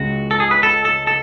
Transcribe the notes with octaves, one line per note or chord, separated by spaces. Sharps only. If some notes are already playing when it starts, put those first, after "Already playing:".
Already playing: C#2 C#3 G#3 F#4
A4
G#4
B4
A4
A4
A4